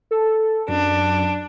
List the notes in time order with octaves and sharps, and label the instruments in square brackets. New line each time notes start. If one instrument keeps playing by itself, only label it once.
[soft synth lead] A4
[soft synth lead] F#2 [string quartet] D4